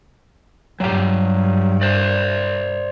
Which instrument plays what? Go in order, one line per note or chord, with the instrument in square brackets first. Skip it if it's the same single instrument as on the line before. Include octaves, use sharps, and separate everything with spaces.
[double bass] G2 [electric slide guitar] F#3 G4
[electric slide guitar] C5 D5